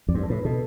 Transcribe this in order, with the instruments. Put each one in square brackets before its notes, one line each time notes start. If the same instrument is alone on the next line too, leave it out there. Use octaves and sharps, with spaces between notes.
[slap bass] F2 [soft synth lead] D5
[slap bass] G2 [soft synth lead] C5
[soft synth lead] A4
[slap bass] A2 [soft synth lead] B4
[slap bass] B2 [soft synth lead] A4